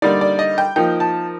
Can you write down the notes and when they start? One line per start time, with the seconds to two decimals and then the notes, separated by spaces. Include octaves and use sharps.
0.02 D3 G3 A#3 D#4 D5
0.21 D5
0.39 D#5
0.58 G5
0.76 F3 A#3 D#4 G5
1.00 A5